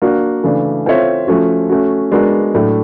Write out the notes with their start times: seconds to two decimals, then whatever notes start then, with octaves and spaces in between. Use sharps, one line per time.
0.02 A#3 D4 F#4
0.44 C#3 E3 A3 D4
0.86 C4 F4 A4 C#5 E5
1.27 F3 A3 C#4 F#4
1.69 A3 C#4 F#4
2.12 G#3 B3 D4 F#4 A#4
2.54 A2 F#3 A3 D4